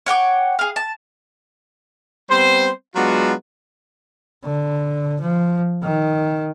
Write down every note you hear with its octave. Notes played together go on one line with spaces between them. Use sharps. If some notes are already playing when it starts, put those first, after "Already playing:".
C#5 F#5 G5 D6
G#4 F5
A5
G3 B3 C4 C5
F#3 G#3 B3 D4 F4 F#4
D3
F3
D#3